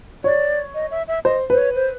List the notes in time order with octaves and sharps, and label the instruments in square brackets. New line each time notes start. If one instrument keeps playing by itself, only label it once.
[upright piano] C#5 [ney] D5
[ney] D#5
E5
E5
[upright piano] C5 [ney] D#5
[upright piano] B4 [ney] C5
[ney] C#5
C5